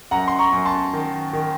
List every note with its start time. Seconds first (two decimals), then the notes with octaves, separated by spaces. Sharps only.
0.11 F#2 F#5 A#5
0.28 C6
0.39 A#5 C#6
0.53 F#2
0.65 A5 C6
0.93 D#3
1.33 D#3